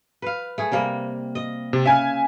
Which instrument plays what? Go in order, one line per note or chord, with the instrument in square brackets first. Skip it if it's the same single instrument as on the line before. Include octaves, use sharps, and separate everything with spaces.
[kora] B4 F5
A3 G#4
C3 G3 A#3
D#5
[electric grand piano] C3
[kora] C#3 F5 [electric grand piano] E5 G#5